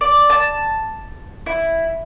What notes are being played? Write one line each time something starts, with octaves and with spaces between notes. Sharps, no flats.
D5
A5
E4